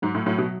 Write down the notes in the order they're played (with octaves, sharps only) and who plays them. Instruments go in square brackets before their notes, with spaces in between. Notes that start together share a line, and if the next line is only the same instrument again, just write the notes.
[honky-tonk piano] G#2 [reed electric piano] F#3
[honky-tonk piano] A2
[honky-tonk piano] A2 [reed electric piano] F#3
[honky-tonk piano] B2